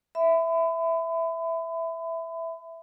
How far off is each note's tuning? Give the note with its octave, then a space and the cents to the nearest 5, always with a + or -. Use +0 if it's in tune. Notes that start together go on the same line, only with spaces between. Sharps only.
E5 +0 B5 +35